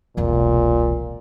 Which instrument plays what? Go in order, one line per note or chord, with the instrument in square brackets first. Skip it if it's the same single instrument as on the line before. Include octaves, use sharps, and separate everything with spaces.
[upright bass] E1 C2 [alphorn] A#2